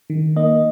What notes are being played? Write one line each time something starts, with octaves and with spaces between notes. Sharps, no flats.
D#3
A#3 D#5